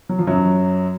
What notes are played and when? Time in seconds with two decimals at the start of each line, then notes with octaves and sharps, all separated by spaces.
0.09 F#3
0.19 F3
0.27 F#2 F#3